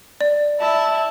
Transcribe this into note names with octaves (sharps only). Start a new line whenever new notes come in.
D5
E4 A5